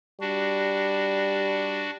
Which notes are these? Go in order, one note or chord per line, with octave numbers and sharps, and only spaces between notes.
G3 D4 F#4